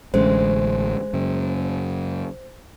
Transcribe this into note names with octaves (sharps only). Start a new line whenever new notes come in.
A1 D3 G#3 A3 C#4 C5
F#2 C#3